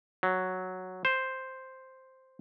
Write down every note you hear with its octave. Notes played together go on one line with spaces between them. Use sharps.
F#3
C5